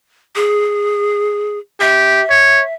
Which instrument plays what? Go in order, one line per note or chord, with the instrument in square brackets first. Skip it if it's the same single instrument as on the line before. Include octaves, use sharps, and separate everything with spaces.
[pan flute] G#4
[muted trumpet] G4 [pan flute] E5
[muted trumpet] C#5